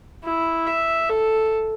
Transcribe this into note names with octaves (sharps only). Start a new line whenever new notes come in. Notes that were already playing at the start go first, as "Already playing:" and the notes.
E4
E5
A4